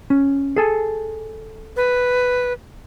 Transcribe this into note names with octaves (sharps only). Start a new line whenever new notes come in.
C#4
G#4 A4 G#5
B4